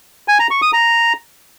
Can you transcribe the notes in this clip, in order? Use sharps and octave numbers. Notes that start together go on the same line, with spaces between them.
G#5
A#5
C#6
D#6
A#5